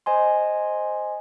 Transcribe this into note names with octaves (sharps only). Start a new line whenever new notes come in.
C5 D#5 G#5 C6